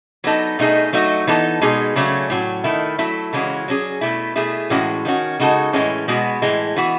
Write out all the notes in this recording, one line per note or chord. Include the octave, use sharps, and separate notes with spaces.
F#3 B3 D#4 A4
B2 A3 D#4 G#4
F#3 A3 D#4 F#4
E3 B3 D#4 A4
B2 G#3 D#4 G#4
C#3 F#3 A3 C#4
A2 F#3 C#4
D#3 A3 E4
F#3 A3 E4 A4
C#3 E3 G#3 C#4 F#4
F#3 C#4 G#4
B2 A3 E4
B2 A3 E4 G#4
A2 E3 G#3 C#4 F#4
D#3 A3 C#4 F#4
C#3 G#3 D#4 F#4 A4
A2 E3 G#3 C#4
B2 G#3 B3 F#4
A2 E3 G#3
E3 B3 F#4